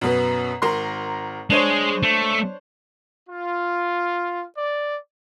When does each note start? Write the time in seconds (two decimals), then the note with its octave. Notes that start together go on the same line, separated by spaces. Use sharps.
0.01 F#2 B2 B3
0.62 G#1 A#4 C6
1.50 G#3 D4 G#4 C5 C#5
2.03 A3
3.29 F4
4.57 D5